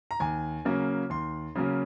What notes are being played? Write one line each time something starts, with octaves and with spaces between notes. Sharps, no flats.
A#5
D#2 G#5
C#3 F#3 A#3 C#4
D#2 C6
C#3 F#3 A#3 C#4